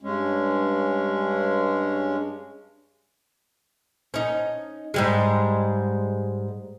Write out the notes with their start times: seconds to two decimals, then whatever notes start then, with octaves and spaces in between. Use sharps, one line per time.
0.02 G2 G#3 C#4
4.14 C#4 D#4
4.94 G#2 G3 G#3